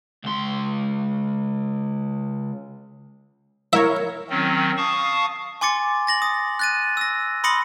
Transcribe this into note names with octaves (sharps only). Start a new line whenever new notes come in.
C#2 C6
E4 A#4 C#5 E5
D#3 F#3 C4 C#4
F5 A5 C#6 D#6
G#5 C6 D6 A6 C#7
A6 A#6 F#7
D#6
F#6 A6 D#7
E6 A#6
B5 C6 D#6 A#6 C#7 F#7